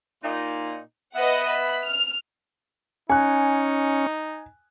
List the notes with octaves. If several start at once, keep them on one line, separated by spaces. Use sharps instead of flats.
A#2 D#4
B3 B4 D#5 E5 F#5
B5
F6
C#4 D#4 G#5 F#6